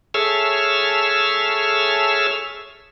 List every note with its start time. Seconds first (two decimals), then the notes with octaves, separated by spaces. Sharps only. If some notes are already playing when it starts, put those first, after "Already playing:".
0.14 G#4 A4 C#5 E5 E6 F6